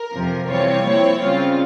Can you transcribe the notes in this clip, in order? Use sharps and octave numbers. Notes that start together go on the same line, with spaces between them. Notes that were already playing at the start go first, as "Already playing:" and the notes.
Already playing: A#4
F2 C3 F3
C3 E3 G3 C4 F4 C#5
A#2 F3 C4 E4
C#3 G3 C4 F4